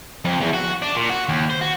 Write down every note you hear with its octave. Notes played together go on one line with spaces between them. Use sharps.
F2
E2
F#4
D4
A#2
F#4
D#2
C5
F#4